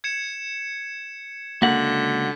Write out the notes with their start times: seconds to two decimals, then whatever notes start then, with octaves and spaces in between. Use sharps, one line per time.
0.04 G#6 C#7 E7
1.62 C#2 D3 A#3 F#4 F#5 B6